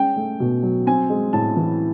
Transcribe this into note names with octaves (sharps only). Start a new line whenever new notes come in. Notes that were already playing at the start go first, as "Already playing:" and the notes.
Already playing: G#3 C#4 G5
A3
B2
F#3
C4 G#5
G#3
A2 A5
E3